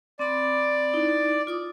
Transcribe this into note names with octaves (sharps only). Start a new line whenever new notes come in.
C4 D5 B5
D#4 E4
F4 D6 D#6